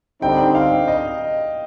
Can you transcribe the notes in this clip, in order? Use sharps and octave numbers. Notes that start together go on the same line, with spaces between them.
D3 G3 C4 D#4 G5
F5
D#5